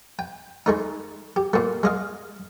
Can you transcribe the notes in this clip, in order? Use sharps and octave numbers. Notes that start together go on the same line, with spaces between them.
G5
G#3 A3 D#4
G4
A#2 A3
G#3 D#5 F5